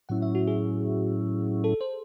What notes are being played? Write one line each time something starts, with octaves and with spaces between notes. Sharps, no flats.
A2 F#3 C#4 E4 F#5
E5
F#4
G#4
A4
C5